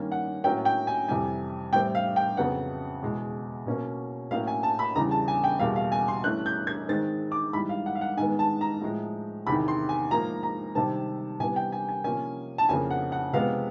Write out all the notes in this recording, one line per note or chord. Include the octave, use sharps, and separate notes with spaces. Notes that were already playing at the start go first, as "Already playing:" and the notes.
Already playing: G2 D#3 G3 A#3 C#4
F#5
A2 F#3 A#3 C#4 G5
G5
G#5
F2 C3 E3 G3 G#5
A2 E3 G3 C4 G5
F5
G5
F2 C#3 F#3 B3 F#5
E2 B2 G#3
B2 F#3 A#3 C#4
A2 F#3 A#3 C#4 F5
G#5
A5
B5
E2 C#3 E3 G3 A#5
A5
G#5
G5
E2 B2 G3 A#3 F5
F5
G#5
C6
G2 E3 A3 C#4 F#6
G6
G#6
G#2 D#3 G#3 C4 A6
D6
G#2 E3 G3 B5
F5
F#5
F5
F#5
G#2 D#3 G#3 B3 G#5
A5
A#5
A2 F3 G#3
E2 C3 D#3 B5
C6
G#5
G#2 F3 A#3 A#5
A#5
C3 D#3 G3 C4 A5
C3 E3 G3 B3 G#5
G5
G#5
G#5
C3 F3 A#3 C#4 G#5
A5
F2 C#3 F3 A#3 G#5
F#5
F#5
C3 F3 G#3 B3 F5